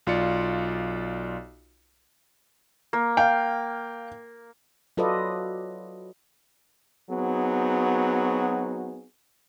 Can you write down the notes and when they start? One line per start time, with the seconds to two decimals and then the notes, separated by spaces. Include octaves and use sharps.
0.07 B1 F4 D5 C#7
2.93 A#3
3.17 F5 G5
4.97 F#3 F4 A4 B4 D5 D#5
7.10 F#3 B3 C4 D#4 F#4 G#4